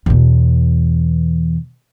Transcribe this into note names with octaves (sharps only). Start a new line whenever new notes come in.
E2 B2